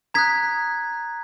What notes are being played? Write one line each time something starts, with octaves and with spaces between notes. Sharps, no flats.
A#5 D#6 F#6 G#6 B6